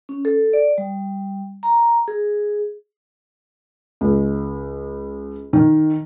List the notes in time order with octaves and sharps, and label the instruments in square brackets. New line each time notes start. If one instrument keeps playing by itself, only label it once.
[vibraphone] C#4
A4
D5
G3
A#5
G#4
[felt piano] C#2
D#3